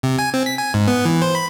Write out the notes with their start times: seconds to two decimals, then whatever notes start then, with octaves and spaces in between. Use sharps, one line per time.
0.03 C3
0.19 G#5
0.34 C4
0.46 B6
0.58 G#5
0.74 G#2
0.88 B3
1.05 E3
1.22 C5
1.35 B5